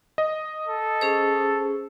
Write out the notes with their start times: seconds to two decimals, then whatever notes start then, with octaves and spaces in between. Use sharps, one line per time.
0.18 D#5
0.68 A4
1.01 C#4 G#4 C5